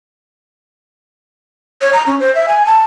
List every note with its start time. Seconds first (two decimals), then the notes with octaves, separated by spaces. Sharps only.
1.81 C#5
1.93 A#5
2.07 C#4
2.20 C5
2.35 E5
2.48 G#5
2.66 A5